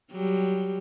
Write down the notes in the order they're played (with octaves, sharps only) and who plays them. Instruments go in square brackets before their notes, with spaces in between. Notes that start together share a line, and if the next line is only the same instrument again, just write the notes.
[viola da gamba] F#3 G3 G4